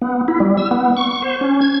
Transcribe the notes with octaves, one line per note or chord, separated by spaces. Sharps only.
B3
E4
G3
E6
B3
C#6
C5
C#4
G#6